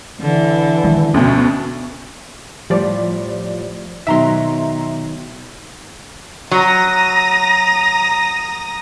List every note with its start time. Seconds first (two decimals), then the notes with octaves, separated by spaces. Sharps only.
0.20 D3 E3
0.84 D#3 F3 G#3
1.14 D2 B2 C#4 F#4
2.70 A2 F3 G3 G4 C5 D5
4.07 B2 D#3 F#3 B3 E5 A#5 C6
6.51 F#3 A#5 D#6 A#6